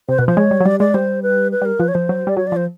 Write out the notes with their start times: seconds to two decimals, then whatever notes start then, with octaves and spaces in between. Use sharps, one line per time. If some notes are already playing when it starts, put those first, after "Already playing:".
0.09 C3 C5
0.18 B2 B4
0.27 F3 C5
0.37 G#3 C#5
0.51 G3
0.61 F#3
0.65 G3 D5
0.80 G#3 D5
0.94 G3 C5
1.23 B4
1.52 B4
1.62 G3 A#4
1.80 F3 B4
1.88 C#5
1.94 F3 C5
2.09 F#3
2.27 G3 D5
2.37 F#3 C#5
2.47 D5
2.52 F3 C5